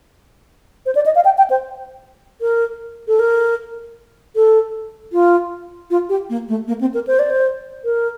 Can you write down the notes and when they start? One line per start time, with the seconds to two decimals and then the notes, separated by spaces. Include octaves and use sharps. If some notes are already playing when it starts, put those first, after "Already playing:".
0.86 C5
0.95 D5
1.06 D#5
1.15 F5
1.25 G5
1.38 G5
1.50 C5
2.41 A#4
3.08 A4
3.19 A#4
4.35 A4
5.13 F4
5.90 F4
6.09 G4
6.30 A#3
6.48 A3
6.68 A#3
6.81 C4
6.94 A#4
7.07 C5
7.19 D5
7.30 C5
7.84 A#4